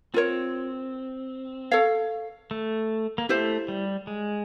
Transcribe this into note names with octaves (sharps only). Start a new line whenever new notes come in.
C4 F4 A#4 C#5
A4 C#5 F5
A3
A#3
A3 E4 G4 C5
G3
G#3